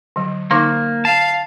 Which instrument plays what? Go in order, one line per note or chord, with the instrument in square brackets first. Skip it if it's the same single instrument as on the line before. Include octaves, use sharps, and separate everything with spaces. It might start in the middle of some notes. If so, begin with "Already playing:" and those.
[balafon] D3 F#3
[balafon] D3 D#4 D6 [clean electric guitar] A#3
[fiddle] F5 [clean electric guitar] A5